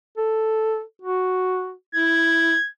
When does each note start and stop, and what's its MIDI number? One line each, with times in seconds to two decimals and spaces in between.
0.17 0.82 69
1.02 1.73 66
1.95 2.54 64
1.95 2.69 92